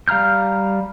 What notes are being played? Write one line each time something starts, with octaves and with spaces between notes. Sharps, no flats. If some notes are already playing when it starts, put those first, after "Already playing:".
G3 F5 A#5 F6 G6